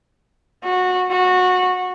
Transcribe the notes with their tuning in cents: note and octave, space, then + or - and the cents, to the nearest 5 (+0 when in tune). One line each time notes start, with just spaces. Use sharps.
F#4 -20
F#4 -20